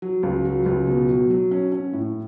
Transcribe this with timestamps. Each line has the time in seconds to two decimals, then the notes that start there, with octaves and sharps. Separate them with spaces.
0.02 F#3
0.23 C#2
0.45 F#3
0.66 C#2
0.88 B2
1.09 F#3
1.30 F#3
1.51 C#4
1.72 C#4
1.93 A2